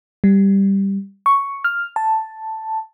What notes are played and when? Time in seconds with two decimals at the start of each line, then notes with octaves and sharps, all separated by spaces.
0.24 G3
1.26 C#6
1.64 F6
1.96 A5